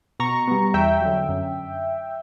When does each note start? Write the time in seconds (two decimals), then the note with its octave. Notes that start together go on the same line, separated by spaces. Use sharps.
0.20 B2 A#5 C#6
0.47 G3 B3
0.74 E2 E5 G5
1.02 D3 F#3
1.29 F#2